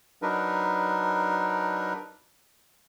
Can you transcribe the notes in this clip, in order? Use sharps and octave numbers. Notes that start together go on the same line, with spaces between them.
F#3 D4 D#4 A#4 B4